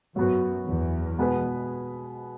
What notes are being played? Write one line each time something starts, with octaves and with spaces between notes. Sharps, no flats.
F#2 F#3 B3 F#4
E2
B2 G#3 B3 G#4 B4